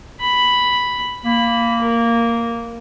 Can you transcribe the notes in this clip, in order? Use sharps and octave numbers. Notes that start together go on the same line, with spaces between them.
B5
A#3 B5
A#4